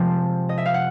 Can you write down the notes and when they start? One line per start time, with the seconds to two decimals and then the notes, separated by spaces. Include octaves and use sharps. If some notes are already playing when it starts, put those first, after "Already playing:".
Already playing: C3 F3 G#3 C4 A5
0.49 D#5
0.58 E5
0.66 F5
0.74 F#5